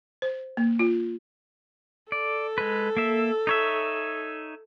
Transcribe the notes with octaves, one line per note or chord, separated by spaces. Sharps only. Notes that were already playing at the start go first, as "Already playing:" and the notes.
C5
A#3
F4
A4 D5
G#3 B4
A#3 E5
D#4 C#5 E5